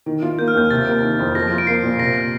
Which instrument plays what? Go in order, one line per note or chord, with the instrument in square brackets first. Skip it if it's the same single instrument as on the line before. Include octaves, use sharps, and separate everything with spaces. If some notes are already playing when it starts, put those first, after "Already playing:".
[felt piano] D#3
F4
[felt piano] A#3 [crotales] G6
[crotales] F6
[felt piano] D#2 [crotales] G6
[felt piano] C3 [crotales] A6
[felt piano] A#3
D#3
F2
[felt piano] F3 [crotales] A#6
[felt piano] F4
[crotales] D7
[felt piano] A#3 [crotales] C7
[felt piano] A#2
[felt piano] C3 [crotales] A#6